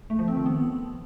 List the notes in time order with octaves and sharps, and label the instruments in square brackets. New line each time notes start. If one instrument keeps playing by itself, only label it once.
[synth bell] A3
F3
C4
D#3
B3